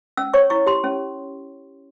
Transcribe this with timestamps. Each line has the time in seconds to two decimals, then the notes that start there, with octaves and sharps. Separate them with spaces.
0.17 C#4 E6
0.34 C#5 C#6
0.50 E4 C#6
0.66 G4 C6
0.84 C#4